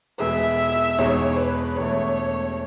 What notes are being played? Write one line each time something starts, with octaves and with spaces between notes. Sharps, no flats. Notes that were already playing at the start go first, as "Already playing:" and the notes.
E2 B2 G#3 B3 E5
E2 B2 G#3 D#4 C#5
B4
E1 E2 B2 A3 C#5